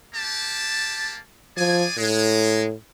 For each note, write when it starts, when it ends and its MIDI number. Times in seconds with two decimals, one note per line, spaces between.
0.14 1.20 58
0.14 1.20 67
0.14 1.20 81
1.57 1.85 53
1.57 1.95 68
1.57 1.95 74
1.57 1.95 80
1.97 2.74 45
1.97 2.65 56